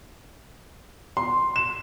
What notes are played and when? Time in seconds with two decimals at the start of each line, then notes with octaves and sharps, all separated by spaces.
1.17 C6
1.56 E7